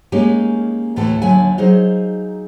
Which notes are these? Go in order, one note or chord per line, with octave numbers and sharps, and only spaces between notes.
G#3 A#3 C#4 D#4 G4 G#5
D2 A2 E3 A3 A4
D#2 D3 F#3 E5 F#5 G#5
F#3 D#4 G#4 C5 D#5 F5